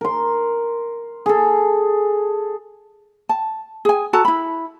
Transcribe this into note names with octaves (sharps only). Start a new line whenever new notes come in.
A#4 C6
G#4 A4
A5
G#4 G#5
F#4 A4 A5 A#5
E4 B5